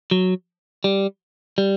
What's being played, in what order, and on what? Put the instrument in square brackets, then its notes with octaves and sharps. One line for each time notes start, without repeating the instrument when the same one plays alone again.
[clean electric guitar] F#3
G3
G3